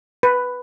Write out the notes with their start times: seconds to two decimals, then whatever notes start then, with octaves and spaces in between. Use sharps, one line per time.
0.23 B4